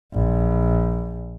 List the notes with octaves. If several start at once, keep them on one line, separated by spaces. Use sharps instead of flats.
A#1